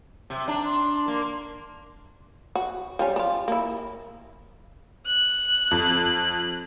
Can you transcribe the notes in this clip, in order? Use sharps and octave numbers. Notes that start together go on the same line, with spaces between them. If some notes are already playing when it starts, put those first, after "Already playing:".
C3
D4 A#5
C6
A#3
F#4
F3 G3 C#4
D4 F4
A#3 E4
F#6
F2